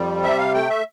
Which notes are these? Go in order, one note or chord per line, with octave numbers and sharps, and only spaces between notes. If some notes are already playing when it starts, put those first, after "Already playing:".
Already playing: F2 G3
C3 E5
F5
A3 G5
E5